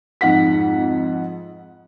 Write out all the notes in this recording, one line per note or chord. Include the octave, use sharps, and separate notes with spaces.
F2 G#2 F#5 B6